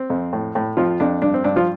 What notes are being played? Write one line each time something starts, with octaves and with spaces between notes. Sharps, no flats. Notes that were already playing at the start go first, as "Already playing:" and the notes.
Already playing: C4
F2
A2
A2
F2 F3 F4
F2 D4
G2 D4
C4
G2 D4
F3 F4